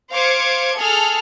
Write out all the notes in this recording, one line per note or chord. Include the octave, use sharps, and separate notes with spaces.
C5 F5 D6 G#6 C#7
G#4 A4 F6